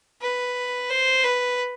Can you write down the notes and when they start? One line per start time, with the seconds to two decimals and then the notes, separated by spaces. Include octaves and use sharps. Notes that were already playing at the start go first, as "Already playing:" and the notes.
0.22 B4
0.89 C5
1.24 B4